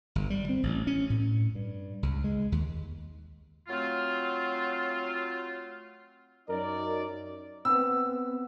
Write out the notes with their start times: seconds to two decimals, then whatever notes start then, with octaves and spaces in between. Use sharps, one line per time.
0.15 G1
0.30 G3
0.49 C4
0.63 A1
0.87 C#4
1.10 A2
1.55 G2
2.03 C#2
2.24 G#3
2.52 D#2
3.67 F#3 A3 C4 F4
6.49 F#2 D#4 A#4 D5
7.65 B3 C4 E6